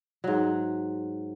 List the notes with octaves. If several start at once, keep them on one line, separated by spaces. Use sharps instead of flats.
G#2 F#3